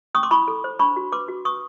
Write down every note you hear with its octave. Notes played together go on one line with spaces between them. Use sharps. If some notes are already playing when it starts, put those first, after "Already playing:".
C#4 C#6 D#6
C6 D6
E4 B5 C#6
A4
C5
D4 B5 C#6
F#4
B4 C6 D6
F#4
B4 C#6 D#6